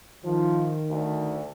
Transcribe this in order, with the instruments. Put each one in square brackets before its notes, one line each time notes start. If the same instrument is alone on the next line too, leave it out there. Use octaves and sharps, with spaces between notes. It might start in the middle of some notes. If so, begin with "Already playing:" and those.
[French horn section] D#3 [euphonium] F3
[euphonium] D2